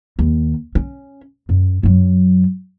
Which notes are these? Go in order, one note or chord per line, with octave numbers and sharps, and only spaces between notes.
D#2
C#4
F#2
F#2 F#3